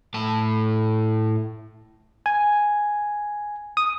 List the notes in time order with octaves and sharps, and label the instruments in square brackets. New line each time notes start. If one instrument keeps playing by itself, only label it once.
[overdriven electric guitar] A2 A5
[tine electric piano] G#5
D#6